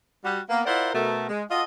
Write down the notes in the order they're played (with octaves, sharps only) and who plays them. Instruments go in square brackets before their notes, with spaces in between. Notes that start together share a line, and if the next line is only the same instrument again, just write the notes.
[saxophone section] G3 F#4
A#3 B3
E4 F4 A#4 C5 D5 F#5
B2 A3 A#4
G#3
F4 F#4 A4 D#5